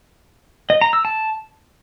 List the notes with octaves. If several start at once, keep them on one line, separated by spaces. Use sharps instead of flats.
D#5
A#5
E6
A5